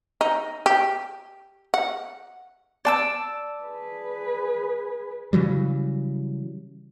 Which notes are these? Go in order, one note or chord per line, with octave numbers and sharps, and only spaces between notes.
D#4
G4
F#5
D5 A5 E6
G#4 B4
C#3 E3 F#3 G3